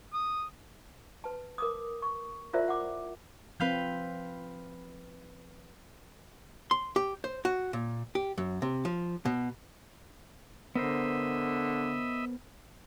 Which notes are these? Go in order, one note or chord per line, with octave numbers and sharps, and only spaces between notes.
D#6
B4 A5
A#4 D6 D#6
C#6
E4 F4 A#4 C5 D5 E5
F#5 D6
F3 C4 B4 F5 G6
C6
G4
C5
F#4
A#2
G4
F#2
C3
F3
B2
D3 B3 A#4 C5 D#5 E5 B5